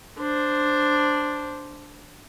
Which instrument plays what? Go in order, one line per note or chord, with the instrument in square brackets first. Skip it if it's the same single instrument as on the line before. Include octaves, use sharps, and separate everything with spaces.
[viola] D4 C5